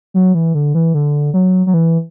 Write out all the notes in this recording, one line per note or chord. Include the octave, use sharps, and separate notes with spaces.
F#3
E3
D3
E3
D3
F#3
F#3
E3